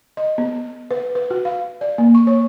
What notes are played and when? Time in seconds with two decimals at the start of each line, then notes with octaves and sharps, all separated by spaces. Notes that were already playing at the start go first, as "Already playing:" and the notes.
0.17 D#5
0.38 B3
0.91 B4
1.15 B4
1.31 F#4
1.45 F5
1.81 D5
1.98 A#3
2.15 C#6
2.27 C#5